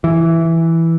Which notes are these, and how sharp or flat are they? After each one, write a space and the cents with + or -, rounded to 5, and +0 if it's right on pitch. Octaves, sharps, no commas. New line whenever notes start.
E3 +0